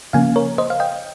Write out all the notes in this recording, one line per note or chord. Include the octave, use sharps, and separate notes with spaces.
C#3 F3 A#3 C#4 F5 G#5
A#4 C#5
C5 D#5
F5
D#5 G5